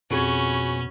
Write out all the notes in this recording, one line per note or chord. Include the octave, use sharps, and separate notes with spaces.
F2 B2 C#4 F#4 G#4 B5 G#6